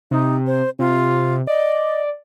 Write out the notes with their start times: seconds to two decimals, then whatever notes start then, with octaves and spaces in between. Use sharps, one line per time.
0.11 C3 D#4
0.47 C5
0.79 C3 F4
1.47 D5 D#5